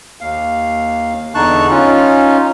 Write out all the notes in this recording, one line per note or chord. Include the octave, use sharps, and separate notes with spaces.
D#2 F5
E2 D3 D#4 A5 C#6 F#6
C#4 D#4 F4